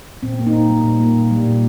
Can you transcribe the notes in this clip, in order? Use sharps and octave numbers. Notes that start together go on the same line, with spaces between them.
A#2 C4
A#3
C4 D#4
A#2
G3
A#2
A#3
A#2
G3
A#2